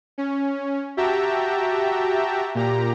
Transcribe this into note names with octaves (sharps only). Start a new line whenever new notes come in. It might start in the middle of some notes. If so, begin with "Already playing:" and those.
C#4
F#4 G4 E5 G5 A5 A#5
A#2 G4 A#5